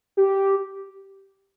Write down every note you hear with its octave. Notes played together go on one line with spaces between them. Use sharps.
G4